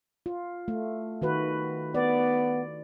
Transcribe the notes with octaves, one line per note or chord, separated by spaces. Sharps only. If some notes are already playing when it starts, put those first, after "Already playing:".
F4
A3
D#3 F#4 B4
B3 D5